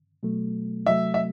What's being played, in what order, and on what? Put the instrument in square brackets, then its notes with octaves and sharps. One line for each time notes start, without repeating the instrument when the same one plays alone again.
[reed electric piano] B2 F#3 A3
[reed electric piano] C3 F#3 A3 [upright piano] E5
[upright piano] E5